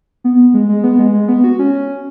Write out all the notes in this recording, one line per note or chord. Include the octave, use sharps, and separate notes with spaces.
B3
G#3
G#3
B3
G#3
G#3
B3
F#4
C#4